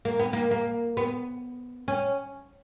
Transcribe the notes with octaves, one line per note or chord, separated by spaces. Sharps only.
A#3
B3
A#3
A#3
B3
C#4